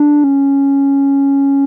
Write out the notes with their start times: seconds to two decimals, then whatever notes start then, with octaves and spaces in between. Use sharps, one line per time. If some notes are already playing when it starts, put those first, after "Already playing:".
Already playing: D4
0.24 C#4